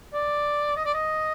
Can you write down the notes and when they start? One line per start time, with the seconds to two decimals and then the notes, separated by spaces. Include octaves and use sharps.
0.13 D5
0.76 D#5
0.85 D5
0.94 D#5